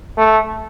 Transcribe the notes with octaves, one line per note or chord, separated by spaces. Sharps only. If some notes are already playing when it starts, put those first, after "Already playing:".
A3